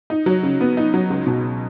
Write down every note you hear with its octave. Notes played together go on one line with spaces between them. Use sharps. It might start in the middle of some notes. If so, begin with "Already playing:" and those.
D#4
F#3
C#3
B3
D#4
F#3
C#2
B2